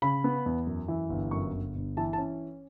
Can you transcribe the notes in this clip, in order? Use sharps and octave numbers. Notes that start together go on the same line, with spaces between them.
C#3 B5
B3
E2
F#2
E3
G1
F#2 C#6
G1
G1
E3 A5
A5
C#4